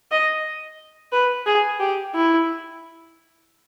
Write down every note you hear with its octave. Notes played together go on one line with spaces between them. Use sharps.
D#5
B4
G#4
G4
E4